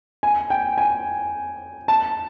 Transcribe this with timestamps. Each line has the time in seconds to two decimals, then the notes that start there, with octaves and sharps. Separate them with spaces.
0.23 G#5
0.50 G5
0.78 G#5
1.88 A5